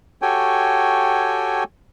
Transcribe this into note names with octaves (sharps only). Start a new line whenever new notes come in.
F#4 G4 A4 C#5 G5 G#5